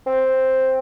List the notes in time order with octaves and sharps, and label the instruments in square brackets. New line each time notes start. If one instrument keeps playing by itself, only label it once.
[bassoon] C4